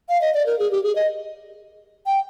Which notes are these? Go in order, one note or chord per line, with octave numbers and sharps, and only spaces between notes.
F5
D#5
D5
A#4
G#4
G4
G#4
D#5
G5